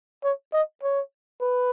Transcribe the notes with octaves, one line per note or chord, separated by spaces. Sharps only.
C#5
D#5
C#5
B4